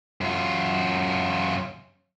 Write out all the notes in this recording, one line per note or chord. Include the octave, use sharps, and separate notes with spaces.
F#2 F4